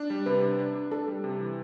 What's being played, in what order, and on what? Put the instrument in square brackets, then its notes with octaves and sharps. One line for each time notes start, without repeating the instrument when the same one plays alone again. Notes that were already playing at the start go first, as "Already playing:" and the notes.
Already playing: [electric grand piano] D4
G3
[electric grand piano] C3 [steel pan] B4
[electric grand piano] D4
D4
D4
[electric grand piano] D4 [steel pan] A4
[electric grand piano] G3
C3
E3